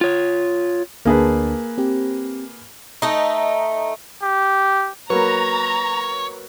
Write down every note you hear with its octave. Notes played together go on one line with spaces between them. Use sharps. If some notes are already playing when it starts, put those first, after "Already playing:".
F4 C#5
D2 A#3 D4 G#4 B4 A5
C4 G4
A3 D#4
G4
F#3 A#3 B4 C#5 A#5